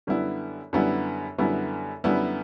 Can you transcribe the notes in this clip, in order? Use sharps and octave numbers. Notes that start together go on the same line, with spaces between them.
F#2 D3 G3 B3 E4
F#2 D3 G3 B3 E4
F#2 D3 G3 B3 E4
F#2 D3 G3 B3 E4